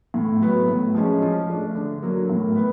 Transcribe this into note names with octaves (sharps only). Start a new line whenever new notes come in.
A2
F#3 B3
A2
F3 G#3 C#4
F3
A3 D4
D3
F#3 A#3
A2
B3